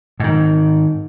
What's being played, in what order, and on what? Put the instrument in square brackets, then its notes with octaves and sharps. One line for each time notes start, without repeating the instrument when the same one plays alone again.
[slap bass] G#2 D#3